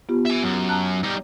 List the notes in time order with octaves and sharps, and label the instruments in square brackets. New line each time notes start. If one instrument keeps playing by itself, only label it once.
[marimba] B3 F4 G4
[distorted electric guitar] E5 G#5
F#2
[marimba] A5 A#5 F#6
[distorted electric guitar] G3 D#4